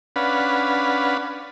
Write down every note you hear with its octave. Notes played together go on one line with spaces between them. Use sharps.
C#4 D4 B4 F5 F#5 B5